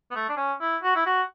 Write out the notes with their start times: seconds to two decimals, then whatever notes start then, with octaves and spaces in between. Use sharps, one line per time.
0.11 B3
0.16 A3
0.29 D4
0.37 C#4
0.61 E4
0.83 F#4
0.96 E4
1.06 F#4